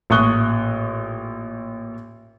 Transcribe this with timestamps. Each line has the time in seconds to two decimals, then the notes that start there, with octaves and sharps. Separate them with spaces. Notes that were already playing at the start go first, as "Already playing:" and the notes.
0.10 A1 A#2 C#6 D#6 F#6 G7